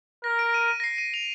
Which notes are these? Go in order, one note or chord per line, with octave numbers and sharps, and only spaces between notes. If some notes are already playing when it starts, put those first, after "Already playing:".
A#4 A#6
D7
D#7
D#7
A#6
C7
D#7
F7